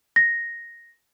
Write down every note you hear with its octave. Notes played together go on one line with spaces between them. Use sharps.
A#6